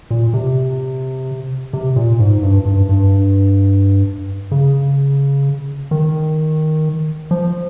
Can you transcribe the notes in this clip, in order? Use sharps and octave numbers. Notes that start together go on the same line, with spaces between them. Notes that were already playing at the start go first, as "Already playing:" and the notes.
A#2
C3
C3
A#2
G#2
G2
G2
G2
C#3
D#3
F3